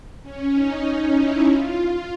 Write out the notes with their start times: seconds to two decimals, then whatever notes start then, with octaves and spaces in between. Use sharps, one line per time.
0.22 C#4
0.53 D#4
0.85 D#4
1.16 E4
1.47 F4